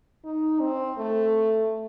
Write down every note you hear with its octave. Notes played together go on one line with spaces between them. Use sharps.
D#4
C4
A3